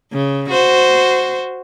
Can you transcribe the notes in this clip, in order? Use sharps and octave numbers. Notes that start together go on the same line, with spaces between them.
C#3
F#4 C5